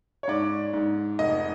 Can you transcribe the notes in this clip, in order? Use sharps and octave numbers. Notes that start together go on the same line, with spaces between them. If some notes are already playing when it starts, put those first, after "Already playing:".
C#5
G#2 D5
G#2
F1 D#5